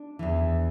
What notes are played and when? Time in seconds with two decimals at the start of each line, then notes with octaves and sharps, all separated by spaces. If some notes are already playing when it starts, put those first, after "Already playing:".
Already playing: D4
0.19 E2 E3